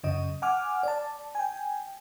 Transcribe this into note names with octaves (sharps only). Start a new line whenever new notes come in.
F#2 C#3 D#5
F#5 G#5 D6 F6
D5 A5
G5 G#5